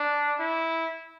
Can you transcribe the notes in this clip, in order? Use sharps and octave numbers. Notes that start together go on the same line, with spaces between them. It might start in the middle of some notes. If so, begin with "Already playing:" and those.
Already playing: D4
E4